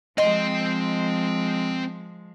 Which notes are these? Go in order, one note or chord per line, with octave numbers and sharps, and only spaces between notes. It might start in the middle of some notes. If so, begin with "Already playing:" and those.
F3 G#3 C4 D#5 C6